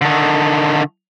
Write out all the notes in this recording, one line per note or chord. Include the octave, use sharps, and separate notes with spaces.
D3 D#3